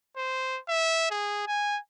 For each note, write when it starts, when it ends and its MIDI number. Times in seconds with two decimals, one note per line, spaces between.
0.17 0.59 72
0.68 1.08 76
1.11 1.44 68
1.47 1.79 80